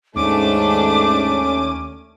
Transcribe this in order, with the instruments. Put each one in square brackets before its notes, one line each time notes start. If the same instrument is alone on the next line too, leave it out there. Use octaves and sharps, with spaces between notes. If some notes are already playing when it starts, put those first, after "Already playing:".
[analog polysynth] D#2 C#4 D#7 [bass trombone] G#2 [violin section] A3 D4 [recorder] D6